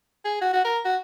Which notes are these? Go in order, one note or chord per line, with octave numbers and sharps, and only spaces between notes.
G#4
F#4
F#4
A#4
F#4